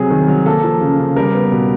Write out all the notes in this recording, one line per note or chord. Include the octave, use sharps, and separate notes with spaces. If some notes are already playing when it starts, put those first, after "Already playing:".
Already playing: C3 F#3 G#4
D#3
F#3
A#3 A4
F3
C#3
C#3
G3 A#4
B3
B2